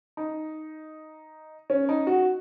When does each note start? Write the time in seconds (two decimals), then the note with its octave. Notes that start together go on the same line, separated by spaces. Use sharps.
0.17 D#4
1.70 C#4
1.89 D#4
2.07 F#4